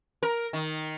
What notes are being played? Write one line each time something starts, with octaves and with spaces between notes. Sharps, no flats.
A#4
D#3